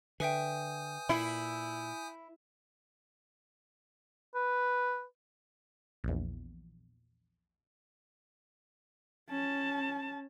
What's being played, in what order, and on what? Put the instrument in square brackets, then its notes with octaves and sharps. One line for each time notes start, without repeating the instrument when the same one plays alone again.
[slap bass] D3 [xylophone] B4 E5 G5 [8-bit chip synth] G#5 D#6 G6
[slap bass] A#2 [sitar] E4
[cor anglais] B4
[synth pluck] A#1 E2
[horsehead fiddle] C#4 A5